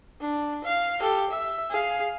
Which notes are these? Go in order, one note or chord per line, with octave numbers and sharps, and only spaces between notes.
D4
F5
G4 A4
E5
G#4 F5